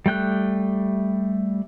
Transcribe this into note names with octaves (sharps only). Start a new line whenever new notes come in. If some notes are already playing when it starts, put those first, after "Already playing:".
G3 A3 G5 F#6